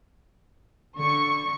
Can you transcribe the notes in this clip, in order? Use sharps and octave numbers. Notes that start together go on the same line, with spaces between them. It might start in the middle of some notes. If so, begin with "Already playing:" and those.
D3 C#6